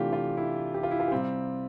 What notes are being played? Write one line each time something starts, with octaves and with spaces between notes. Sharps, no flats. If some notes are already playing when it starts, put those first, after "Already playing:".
Already playing: C3 E3 A3 D4 F4 G4
F4
E4
G4
F4
E4
F4
G4
C3 G3 C4 F4